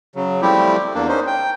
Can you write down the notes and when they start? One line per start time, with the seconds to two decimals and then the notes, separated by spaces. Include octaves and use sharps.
0.15 C#3 F#3
0.42 F3 G3 A3 C4 E4 G4
0.94 E2 A#3 D4
1.08 C#4 D#4 C5
1.27 G5